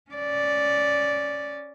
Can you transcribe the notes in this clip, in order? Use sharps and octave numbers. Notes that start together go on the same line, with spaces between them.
C#4 D5